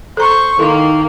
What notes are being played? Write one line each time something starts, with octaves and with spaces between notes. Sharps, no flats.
A4 C5 A#5 C#6
D#3 A#3 D#4 E4 A4